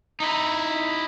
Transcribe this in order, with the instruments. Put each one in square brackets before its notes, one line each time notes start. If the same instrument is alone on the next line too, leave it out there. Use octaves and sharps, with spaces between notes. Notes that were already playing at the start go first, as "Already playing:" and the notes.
[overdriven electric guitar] D#4 E4